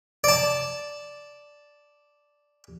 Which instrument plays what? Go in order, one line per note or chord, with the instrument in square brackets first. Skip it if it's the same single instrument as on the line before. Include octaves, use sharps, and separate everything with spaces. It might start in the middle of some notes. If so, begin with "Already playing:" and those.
[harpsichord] D5 A5